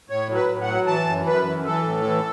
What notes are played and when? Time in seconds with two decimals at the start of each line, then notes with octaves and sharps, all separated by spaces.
0.10 A2 C#5
0.29 F#3
0.35 B4
0.49 A2
0.62 F#5
0.67 F#3
0.87 E3 A5
1.06 F#2
1.26 F#2 B4
1.45 E3
1.65 E3 A4
1.84 A2
2.04 E3